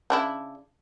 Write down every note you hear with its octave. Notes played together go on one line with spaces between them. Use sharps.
C#3 D4 E4